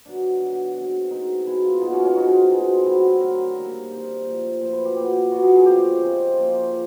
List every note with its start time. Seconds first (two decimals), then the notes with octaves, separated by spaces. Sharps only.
0.06 D3 F#3 B3 D4
0.40 D3 F#3 B3
0.76 B2 G#3 C4
1.11 B2 G#3 C4 D#4
1.46 B2 G#3 B3 E4
1.64 F4
1.81 B2 G#3 B3 D#4
1.93 C#4
2.05 C#4
2.16 B2 G#3 C4 D#4
2.51 B2 G#3 C4
2.86 D3 F#3 A3 C4 E4
3.21 D3 F#3 A3 C4 A#4
3.56 C3 D#3 G3 A#3
3.91 C3 D#3 G3 A#3 C5
4.26 A#2 F3 A3 C4
4.61 A#2 F3 A3 C4 C5
4.73 B4
4.85 G4
4.96 A#2 F#3 B3 G4
5.31 A#2 F#3 B3 F#4
5.42 G#4
5.55 G#4
5.66 C#3 F3 G#3 C4 G4
6.02 C#3 F3 G#3 C4
6.36 C#3 F3 A#3 F4
6.71 C#3 F3